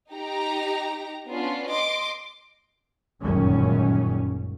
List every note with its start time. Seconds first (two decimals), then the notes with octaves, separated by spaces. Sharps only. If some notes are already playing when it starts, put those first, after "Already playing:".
0.13 D#4 G4 A#5
1.29 B3 C#4 D4 F4
1.71 D#5 C6 D6
3.22 G1 C#2 F#2 A#2 D#3 C#4